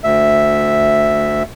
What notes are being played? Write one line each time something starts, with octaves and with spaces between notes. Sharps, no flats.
D2 E5